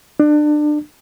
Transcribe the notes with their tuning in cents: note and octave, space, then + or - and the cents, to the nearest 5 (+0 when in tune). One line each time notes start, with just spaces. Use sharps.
D4 +30